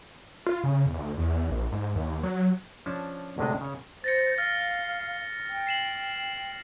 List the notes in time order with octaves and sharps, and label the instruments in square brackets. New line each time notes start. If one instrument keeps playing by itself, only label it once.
[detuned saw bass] F4
C#3
E2
D2
E2
A#1
G#2
D#2
F#3
[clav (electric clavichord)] F3 C#4 D4 A5
D2 A2 C3 G#3 D4 D#5
C#3 C#5
[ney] C5 [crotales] A6 A#6 C#7
[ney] F5 [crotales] F6 A6 A#6
[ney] G5
[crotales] C7 E7 F#7